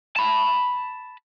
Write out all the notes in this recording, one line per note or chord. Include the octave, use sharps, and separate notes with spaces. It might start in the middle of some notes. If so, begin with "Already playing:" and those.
A5 B5